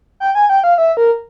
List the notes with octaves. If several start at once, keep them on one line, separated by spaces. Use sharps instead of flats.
G5
G#5
G5
F5
E5
A#4